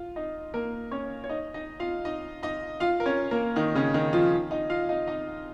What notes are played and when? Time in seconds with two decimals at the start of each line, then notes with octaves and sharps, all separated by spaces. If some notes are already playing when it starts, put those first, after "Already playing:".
Already playing: F4 F5
0.16 D#4 D#5
0.54 A#3 A#4
0.91 C#4 C#5
1.24 C#5
1.29 D#4 D#5
1.54 D#4 D#5
1.80 F4 F5
2.05 D#4 D#5
2.43 D#4 D#5
2.80 F4 F5
3.00 A#4
3.06 C#4 C#5
3.31 A#3 A#4
3.56 D#3 D#4
3.75 C#3 C#4
3.94 D#3 D#4
4.13 F3 F4
4.51 D#4 D#5
4.70 F4 F5
4.89 D#4 D#5
5.07 D#4 D#5